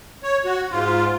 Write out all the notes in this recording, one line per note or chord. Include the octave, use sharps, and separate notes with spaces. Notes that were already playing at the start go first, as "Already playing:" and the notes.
C#5
F#4
G#2 F4